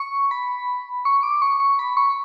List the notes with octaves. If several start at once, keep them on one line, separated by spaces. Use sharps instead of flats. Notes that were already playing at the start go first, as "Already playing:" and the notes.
Already playing: C#6
B5
C#6
D6
C#6
C#6
B5
C#6